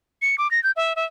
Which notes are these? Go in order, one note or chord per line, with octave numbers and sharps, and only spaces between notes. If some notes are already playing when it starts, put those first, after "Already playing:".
C#7
D6
A#6
G6
E5
E5